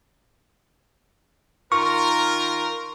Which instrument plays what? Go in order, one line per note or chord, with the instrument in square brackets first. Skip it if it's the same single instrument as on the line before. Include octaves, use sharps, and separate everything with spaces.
[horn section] D#3 F4 A#4 [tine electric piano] C#6